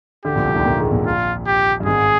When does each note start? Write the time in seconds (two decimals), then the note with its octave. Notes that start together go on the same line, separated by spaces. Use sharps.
0.25 D2 D3 G4
0.35 A#1 A#2
0.45 C2 C3
0.56 D#2 D#3
0.65 A#2 A#3
0.79 G#2 G#3
0.92 A#1 A#2
1.06 F4
1.47 G4
1.80 G2
1.86 G#1 G#2 G#4